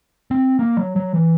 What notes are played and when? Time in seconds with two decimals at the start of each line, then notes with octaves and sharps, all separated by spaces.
0.31 C4
0.59 A#3
0.77 F#3
0.96 F#3
1.14 E3